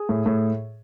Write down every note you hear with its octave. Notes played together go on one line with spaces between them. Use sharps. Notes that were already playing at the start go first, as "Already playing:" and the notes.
Already playing: G#4
A2
A2